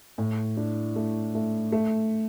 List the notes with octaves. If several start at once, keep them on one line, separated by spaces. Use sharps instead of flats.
A2
D4
A3
A3
A3